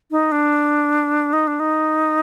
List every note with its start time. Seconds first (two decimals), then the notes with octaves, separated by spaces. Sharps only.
0.11 D#4
0.32 D4
1.33 D#4
1.47 D4
1.60 D#4